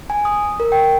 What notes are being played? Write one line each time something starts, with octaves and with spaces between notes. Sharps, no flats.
G#5
D#6
A#4
G5